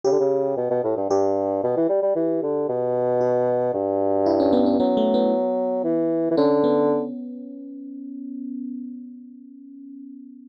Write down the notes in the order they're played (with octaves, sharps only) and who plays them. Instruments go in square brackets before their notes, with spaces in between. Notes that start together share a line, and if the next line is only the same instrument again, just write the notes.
[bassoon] C#3 [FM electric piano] G4
[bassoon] D3
C#3
B2
B2
A2
G2
[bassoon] G2 [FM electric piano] G4
[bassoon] B2
E3
G3
G3
E3
D3
B2
[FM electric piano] F#4
[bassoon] G2
[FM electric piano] E4
C#4
B3
C#4
[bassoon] F#3 [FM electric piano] B3
[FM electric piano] A3
B3
[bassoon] E3
E3
[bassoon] D3 [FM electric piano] C#4
[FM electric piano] B3